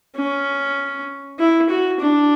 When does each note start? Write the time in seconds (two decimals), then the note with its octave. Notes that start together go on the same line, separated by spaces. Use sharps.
0.16 C#4
1.39 E4
1.69 F#4
2.00 D4